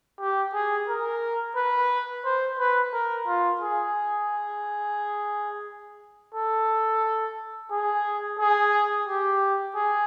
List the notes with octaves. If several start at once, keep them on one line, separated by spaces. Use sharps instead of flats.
G4
G#4
A#4
B4
C5
B4
A#4
F4
G#4
A4
G#4
G#4
G4
G#4